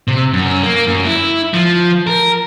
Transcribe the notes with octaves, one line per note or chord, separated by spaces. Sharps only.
C3
F#2
A#3
F#2
E4
F3
A#4